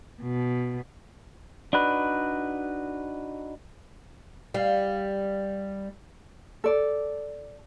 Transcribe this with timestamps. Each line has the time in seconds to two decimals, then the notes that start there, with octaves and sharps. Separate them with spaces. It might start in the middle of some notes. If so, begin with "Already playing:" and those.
0.22 B2
1.73 D4 D#4 F#4 B4
4.54 G3 F5
6.64 A4 D5